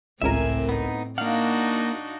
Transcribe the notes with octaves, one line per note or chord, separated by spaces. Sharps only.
G#1 C#2 A2 C4 A#4 E5 G#5
B3 D#4
A#3 D4 D#4 F#4 F5 F#5